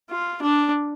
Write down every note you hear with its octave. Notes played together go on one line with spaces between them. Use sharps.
F4
D4